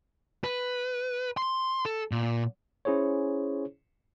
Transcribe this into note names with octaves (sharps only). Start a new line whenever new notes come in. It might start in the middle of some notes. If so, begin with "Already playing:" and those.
B4
C6
A4
A#2
C#4 E4 G#4 C5 C#5